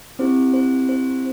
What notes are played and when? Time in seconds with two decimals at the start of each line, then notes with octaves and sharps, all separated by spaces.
0.19 C4 E4 G4 C5
0.54 C5
0.89 C5